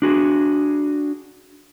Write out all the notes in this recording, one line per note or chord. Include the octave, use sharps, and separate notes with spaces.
D4 F#4 G#4